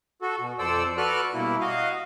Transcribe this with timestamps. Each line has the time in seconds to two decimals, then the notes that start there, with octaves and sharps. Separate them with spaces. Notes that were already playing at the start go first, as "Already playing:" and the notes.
0.22 F#4 A4
0.39 B2
0.59 F2 A4 C5 D5 E6
0.97 F#4 A4 B4 D5 F6 F#6
1.34 G2 B2 A#3 E4
1.60 F#4 D#5 F5